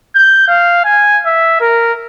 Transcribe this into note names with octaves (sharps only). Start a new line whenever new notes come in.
G6
F5
G#5
E5
A#4